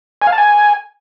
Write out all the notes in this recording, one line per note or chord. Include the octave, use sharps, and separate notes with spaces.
G#5
F5
A5
G#5